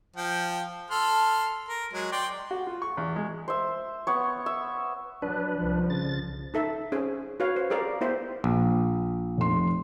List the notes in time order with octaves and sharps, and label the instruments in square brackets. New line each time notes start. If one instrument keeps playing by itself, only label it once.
[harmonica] F3 G5
A4 C6 F6
A#4
F#3 G#3
D5 G5 C6
[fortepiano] F#4
F4
C#6
E2
G#3
[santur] C5 E5
B3 C#5
E5
[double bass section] F#3 [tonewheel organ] D4 B4
[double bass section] C2 F3
[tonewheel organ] C#3 A6
[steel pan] D#4 A4 E5
C#4 G#4 C5
F#4 B4 C#5 F5
C5
G4 G#4 A#4 D5 F5
B3 E4 C5 E5 G5
[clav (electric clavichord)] A#1
[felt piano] F1 C6